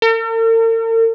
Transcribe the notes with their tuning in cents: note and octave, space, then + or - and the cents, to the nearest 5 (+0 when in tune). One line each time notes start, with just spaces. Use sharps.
A#4 -45